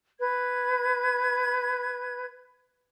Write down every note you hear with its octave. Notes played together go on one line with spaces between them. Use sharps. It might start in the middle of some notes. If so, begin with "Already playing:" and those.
B4 G#6